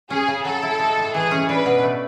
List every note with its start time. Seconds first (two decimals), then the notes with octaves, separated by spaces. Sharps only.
0.10 C#4 G#4
0.28 C#3
0.45 F#3 A4
0.63 E4
0.79 G#3
0.97 A2
1.14 E3 G#4
1.31 C#4
1.49 D4 B4
1.66 B2
1.83 A3